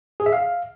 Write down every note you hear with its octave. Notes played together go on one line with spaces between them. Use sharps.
G#4
E5
F5